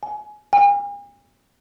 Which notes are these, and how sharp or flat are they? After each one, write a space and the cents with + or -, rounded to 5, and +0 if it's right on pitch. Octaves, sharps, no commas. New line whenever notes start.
G#5 +15
G#5 -45